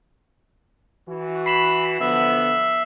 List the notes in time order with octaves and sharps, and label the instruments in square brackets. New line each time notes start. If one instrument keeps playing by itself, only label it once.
[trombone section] E3 F#4
[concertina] B5 [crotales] C7 E7 F#7
[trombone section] D3 F3 B3 [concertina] E5